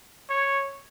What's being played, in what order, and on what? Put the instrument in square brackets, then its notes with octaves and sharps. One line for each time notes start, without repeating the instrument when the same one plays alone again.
[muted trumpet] C#5